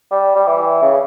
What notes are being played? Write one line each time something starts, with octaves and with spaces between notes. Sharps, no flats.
G3
G3
E3
C#3